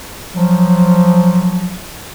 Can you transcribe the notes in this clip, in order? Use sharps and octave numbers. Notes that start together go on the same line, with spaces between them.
F3 F#3